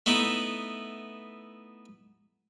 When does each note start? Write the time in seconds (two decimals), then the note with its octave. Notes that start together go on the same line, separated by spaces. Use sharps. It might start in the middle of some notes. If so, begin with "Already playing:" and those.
0.06 A3 B3 D#4 E4